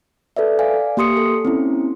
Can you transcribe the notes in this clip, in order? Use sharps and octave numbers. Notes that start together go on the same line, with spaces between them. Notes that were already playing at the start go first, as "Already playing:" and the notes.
A4 B4 D5 E5
D5 F5 G#5
A#3 G4 C6 D#6 C#7
A4
C4 C#4 E4